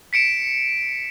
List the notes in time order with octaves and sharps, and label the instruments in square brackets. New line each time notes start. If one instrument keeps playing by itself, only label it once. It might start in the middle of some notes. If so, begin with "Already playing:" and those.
[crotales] B6 C#7 D7 E7